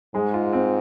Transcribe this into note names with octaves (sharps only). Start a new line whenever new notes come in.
G#2 G#3
F4
C4